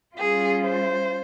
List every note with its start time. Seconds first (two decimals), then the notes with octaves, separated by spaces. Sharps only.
0.16 G3 C#4 F4 G#4
0.61 C5